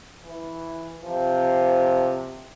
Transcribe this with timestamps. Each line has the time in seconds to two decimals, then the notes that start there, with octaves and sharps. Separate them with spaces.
0.24 E3
1.04 C3 F3